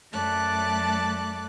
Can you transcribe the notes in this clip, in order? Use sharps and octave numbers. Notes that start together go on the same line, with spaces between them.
F#2 F#3 A3 D5 A5 F#6